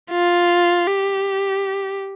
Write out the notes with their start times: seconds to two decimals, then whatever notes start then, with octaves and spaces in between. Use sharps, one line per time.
0.11 F4
0.87 G4